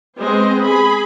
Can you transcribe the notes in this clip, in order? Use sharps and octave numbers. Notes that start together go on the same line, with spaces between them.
G#3 B3 C4 C5 D#5
G#4 B5